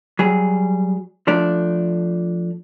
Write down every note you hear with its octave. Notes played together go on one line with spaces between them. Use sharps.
F#3 G3 G#4
F3 A3 D4